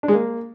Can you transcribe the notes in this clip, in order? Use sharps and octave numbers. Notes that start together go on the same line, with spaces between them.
D4
G#3
A#3